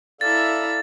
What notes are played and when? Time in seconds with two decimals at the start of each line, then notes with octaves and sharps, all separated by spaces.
0.21 E4 A4 D5 E5 F5 A#5 A6